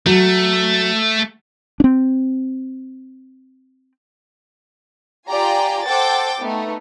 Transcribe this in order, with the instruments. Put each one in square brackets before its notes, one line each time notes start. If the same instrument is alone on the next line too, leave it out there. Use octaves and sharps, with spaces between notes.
[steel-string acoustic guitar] F#3 [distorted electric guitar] A3
[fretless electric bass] C4 D4
[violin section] F4 G4 D5 G5 G#5 A#5
A4 C5 F#5 G5 D6 A6
A3 B3 D#4